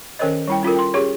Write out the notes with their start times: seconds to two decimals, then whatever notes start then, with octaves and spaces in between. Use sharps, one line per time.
0.19 D#3 C#4 A#4 C5 C#5 D#5
0.48 G3 E4 G5
0.63 C#4 F4 A4 A#4
0.75 G5 C6
0.94 C#4 G4 G#4 C#5